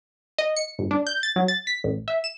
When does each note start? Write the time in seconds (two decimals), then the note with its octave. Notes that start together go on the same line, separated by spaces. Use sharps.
0.38 D#5
0.56 C#7
0.79 G1
0.91 D4
1.07 G6
1.23 A6
1.36 F#3
1.48 A6
1.67 B6
1.84 A1
2.08 E5
2.24 E7